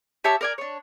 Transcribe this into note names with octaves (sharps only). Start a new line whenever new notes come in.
G4 C#5 E5 A5
A#4 D5 G#5
D4 C#5